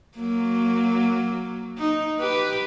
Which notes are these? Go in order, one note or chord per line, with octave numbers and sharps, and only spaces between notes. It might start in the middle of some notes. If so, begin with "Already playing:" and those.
F#3 A#3
D#4
G4 B4